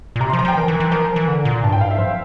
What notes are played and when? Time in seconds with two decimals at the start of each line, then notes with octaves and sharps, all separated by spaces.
0.16 A#2
0.20 C3 A#5
0.30 C6
0.33 F3
0.39 A#5
0.45 F3 G5
0.56 E3 A#4
0.68 E3
0.80 E3
0.91 F3 A#4
1.16 E3
1.28 D3
1.45 A#2
1.63 G2 A5
1.72 G5
1.75 A2
1.81 F5
1.87 G2 E5
1.98 F3 C5